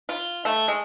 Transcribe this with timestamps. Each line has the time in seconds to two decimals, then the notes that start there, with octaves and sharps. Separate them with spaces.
0.09 F4
0.45 A3
0.68 G#3